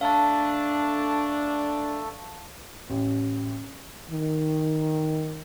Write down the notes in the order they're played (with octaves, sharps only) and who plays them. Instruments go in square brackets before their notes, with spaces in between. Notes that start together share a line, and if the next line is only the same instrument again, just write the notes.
[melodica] A3 A4 [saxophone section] D4 [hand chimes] F5 A5
[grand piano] A1
[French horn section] D#3